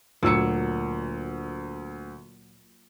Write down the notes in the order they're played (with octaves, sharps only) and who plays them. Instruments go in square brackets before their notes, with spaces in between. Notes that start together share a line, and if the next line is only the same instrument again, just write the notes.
[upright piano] D2 E6 C#7 [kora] A#2 F#3